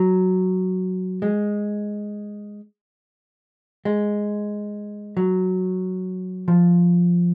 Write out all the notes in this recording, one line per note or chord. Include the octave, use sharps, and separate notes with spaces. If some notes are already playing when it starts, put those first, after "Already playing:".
Already playing: F#3
G#3
G#3
F#3
F3